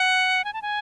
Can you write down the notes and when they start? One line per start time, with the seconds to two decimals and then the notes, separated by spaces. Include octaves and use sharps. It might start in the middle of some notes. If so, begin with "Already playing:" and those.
Already playing: F#5
0.45 G#5
0.53 A5
0.62 G#5